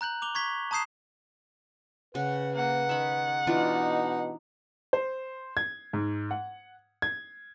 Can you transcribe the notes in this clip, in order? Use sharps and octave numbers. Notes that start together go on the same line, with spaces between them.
A#5 F#6 G6 F#7
D6 F7 G7
C#6 G#6 B6 G7
A5 A#5 D#6 G6 C7 E7
C#3 B4 F#5
A#3 F#5
D#3 E5 B5
B2 E3 D4 D#4 F4
C5
G#6
G#2
F#5
G#6